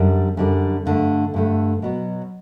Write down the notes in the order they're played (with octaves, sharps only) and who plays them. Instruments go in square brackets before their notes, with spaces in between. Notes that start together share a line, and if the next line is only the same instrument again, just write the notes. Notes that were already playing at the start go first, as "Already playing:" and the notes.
Already playing: [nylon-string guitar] F#2 D3 G3
F#2 D3 G3
G2 D3 A3
G2 D3 A3
B2 F#3 B3